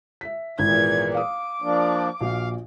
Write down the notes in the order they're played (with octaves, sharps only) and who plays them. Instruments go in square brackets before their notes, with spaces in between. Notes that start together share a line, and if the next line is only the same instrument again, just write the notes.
[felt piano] E5 B6
[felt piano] G#1 E4 [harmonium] E2 A#2 [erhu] G#6
[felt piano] F5 D#6 [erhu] D6
[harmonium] F3 A#3 D4
[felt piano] A#1 A#2 F#4 [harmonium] F5